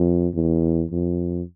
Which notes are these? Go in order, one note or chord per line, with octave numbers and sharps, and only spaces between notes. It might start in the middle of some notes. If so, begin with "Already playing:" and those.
Already playing: F2
E2
F2